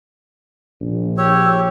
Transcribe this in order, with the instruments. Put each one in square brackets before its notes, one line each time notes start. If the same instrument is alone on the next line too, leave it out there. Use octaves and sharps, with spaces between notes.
[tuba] A#1
[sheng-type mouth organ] G4 C#5 [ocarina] E6